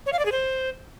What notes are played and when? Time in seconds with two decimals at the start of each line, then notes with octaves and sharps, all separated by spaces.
0.06 C#5
0.13 F5
0.19 D5
0.25 G#4
0.32 C5